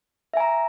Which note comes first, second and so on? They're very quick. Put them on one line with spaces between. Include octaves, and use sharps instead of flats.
E5 G#5 A#5